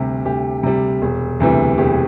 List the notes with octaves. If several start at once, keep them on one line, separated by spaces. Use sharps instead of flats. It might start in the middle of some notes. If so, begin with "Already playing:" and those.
Already playing: D2 C3 G3 G4
D2 G4
C3 G3
E1
D2 C3 E3 G3
E1 G4